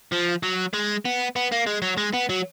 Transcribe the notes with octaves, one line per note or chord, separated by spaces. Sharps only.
F3
F#3
G#3
B3
B3
A#3
G#3
F#3
G#3
B3
F#3